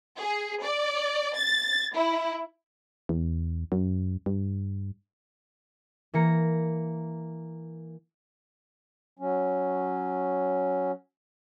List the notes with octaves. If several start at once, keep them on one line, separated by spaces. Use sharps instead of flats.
G#4
D5
A6
E4
E2
F#2
G2
E3 A#3 A#5 C#7
F#3 C#4